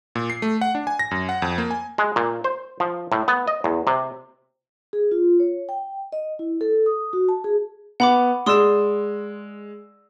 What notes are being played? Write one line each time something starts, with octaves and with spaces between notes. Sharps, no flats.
A#2
C7
A3
F#5
D4
G#5
A#6
F#2
F#5
F2
A#3
G#5
G#3
A#2
C5
F3
A2
B3
D#5
E2
C3
G#4
F4
C#5
G5
D#5
E4
A4
D#6
F#4
A5
G#4
B3 F#5 B5 D6
G#3 D5 C6 D#6 E6 E7